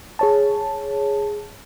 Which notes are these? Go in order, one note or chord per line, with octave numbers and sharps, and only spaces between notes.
G#4 C#5 A5